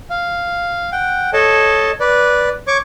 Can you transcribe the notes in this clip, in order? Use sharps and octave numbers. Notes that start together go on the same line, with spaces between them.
F5
F#5 G5
A4 C#5 D#5 A5
B4 D5
C#5 C#6 D6